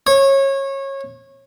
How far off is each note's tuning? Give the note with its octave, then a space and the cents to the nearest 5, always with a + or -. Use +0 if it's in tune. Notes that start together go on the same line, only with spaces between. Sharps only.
C#5 -25